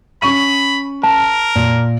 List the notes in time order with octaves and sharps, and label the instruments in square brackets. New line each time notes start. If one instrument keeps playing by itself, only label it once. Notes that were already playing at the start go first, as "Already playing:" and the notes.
[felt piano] C#4 C#6 D#7 [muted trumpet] B5
[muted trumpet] A#4 [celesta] A5
[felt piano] A#2